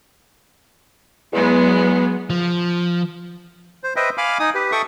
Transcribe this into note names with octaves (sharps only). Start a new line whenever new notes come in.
E2 F#3 G#3 B3
F3
C5
B4 C5 D#5 E5 G5
F5 G#5 B5 D6 F6
D#4 G#5 D#6
G4 B4
A4 E5 G5 C#6 D#6